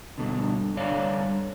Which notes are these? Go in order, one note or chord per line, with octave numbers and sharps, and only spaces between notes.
G2 B2 D3
G2 D3 D4 C#5 D5 F5